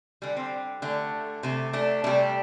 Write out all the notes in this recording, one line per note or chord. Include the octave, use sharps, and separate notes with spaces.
D3 G3
C4
D3 A3
C3 A3
A3 D4
C3 G3 A3 D4